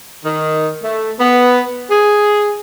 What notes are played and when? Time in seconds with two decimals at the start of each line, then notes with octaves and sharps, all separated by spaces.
0.25 D#3
0.83 A3
1.20 B3
1.90 G#4